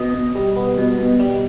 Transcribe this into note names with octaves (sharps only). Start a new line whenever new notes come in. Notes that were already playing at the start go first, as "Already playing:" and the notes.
Already playing: B2 D#5
B2
G3
B3
B2
B2
G3